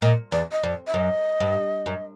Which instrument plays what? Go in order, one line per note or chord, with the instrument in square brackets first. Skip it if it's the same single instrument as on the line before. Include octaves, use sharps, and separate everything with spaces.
[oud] A#2 [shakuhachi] D#5
[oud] E2 [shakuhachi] D5
[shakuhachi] D#5
[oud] F2 [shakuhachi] D5
[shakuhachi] E5
[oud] F#2 [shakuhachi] D#5
[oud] G2
F#2